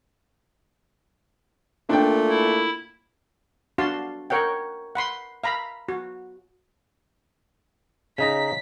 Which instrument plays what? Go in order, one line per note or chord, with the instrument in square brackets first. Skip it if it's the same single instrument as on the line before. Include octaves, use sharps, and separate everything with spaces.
[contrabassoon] A#2 [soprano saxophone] A3 [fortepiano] D4 G5
[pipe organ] E4
[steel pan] D4 F#4 F5 A5 C6
A#4 C#5 F#5 G5
F#5 B5 C6
F5 A#5 B5
F#4
[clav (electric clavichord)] C#3 D#4 A#5 [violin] B6